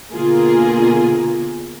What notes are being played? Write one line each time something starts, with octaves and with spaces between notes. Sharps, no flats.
B2 D3 A#3 F4 G#4 A#4